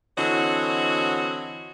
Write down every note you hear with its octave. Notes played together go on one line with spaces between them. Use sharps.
D3 E3 C4 F#4 C#5 D#5